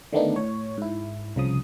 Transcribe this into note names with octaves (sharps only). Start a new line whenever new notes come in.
D3 D#3 A3 B3 D4 D#4
A2 C#5
G#2 E4
C2 C#3 F3 D#6